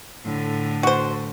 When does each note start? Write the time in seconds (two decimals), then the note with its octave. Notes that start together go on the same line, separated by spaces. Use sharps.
0.24 A2 D3
0.83 F#4 C5